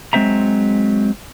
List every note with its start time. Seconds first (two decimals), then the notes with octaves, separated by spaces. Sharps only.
0.13 F#3 G#3 C4 C5 E5 A#5